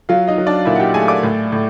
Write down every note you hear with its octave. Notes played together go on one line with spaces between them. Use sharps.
F#3 F4 F5
D#4 D#5
F#3
D4 D5
A#2 E4 E5
F#5
G4 G5
A3 G#4 G#5
D5 D6
A2
A2